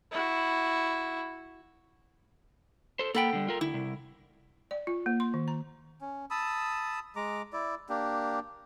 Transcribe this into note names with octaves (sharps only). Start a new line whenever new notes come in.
E4 F#4
A4 C5
A#3 A4 F#5 G5 B5
D3 G3
F4 A#4
D2 E4
C2
D5
F4
A#3
C6
D#3
A#5
C#4
A5 B5 D#6 E6
G#3 A#5 D6
E4 D5
A#3 D4 G4